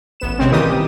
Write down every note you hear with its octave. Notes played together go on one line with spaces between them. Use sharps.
A1 B3 E7
C3 G#3 C4 C#4
A#2 D#3 E3 G3 G4 D#6